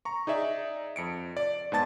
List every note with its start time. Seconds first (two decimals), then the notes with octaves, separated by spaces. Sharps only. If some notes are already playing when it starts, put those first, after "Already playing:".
0.05 A#5 C#6
0.27 D#4 G#4 D5 E5
0.96 F2 C#7 D7
1.37 D5
1.72 G#2 B3 A5 A6